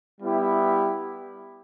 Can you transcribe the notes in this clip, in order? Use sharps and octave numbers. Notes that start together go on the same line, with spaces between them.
G3 B3 E4 G4